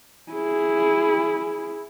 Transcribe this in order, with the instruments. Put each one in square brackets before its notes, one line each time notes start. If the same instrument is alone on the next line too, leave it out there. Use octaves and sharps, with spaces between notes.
[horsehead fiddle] E4 G#4